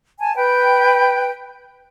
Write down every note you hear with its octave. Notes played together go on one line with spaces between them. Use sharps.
G#5 A5
B4 G5